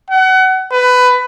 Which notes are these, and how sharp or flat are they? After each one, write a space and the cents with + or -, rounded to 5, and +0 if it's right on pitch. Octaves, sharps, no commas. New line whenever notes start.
F#5 +30
B4 +15